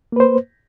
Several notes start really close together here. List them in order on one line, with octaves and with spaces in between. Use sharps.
A#3 B4 C5